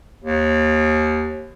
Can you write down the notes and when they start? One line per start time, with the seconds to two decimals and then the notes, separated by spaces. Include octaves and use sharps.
0.24 D#2